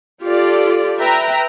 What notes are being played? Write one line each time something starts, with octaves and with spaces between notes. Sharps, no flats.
F4 G4 A4 D5
B4 E5 G5 A#5